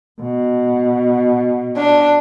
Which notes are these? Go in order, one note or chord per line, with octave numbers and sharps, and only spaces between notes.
B2
D4